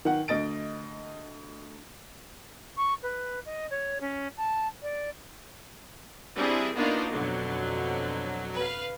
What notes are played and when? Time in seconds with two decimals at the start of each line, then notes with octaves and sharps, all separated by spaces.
0.05 D#3 F#5
0.28 D2 D#5 A6 D7
2.76 C#6
3.02 B4
3.45 D#5
3.70 C#5
4.00 C#4
4.37 A5
4.82 D5
6.36 G3 C4 D4 E4 G#4
6.76 A#3 B3 D4 D#4 F4 F#4
7.12 F2 B2 D3 F#3
8.55 B4 F5